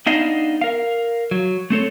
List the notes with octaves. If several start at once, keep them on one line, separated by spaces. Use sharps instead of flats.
B3 D4 D#4 D#5 F5
A#4 F5
F#3
A3 C4 A4 C#5